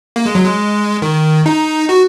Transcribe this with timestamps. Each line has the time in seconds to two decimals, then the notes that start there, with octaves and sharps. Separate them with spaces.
0.16 A#3
0.26 G#3
0.35 F#3
0.45 G#3
1.02 D#3
1.46 D#4
1.89 F#4